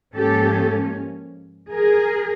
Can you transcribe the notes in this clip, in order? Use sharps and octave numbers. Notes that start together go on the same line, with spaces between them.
G#2 F3 A#3 C#4 G4 A4
G#4 A#4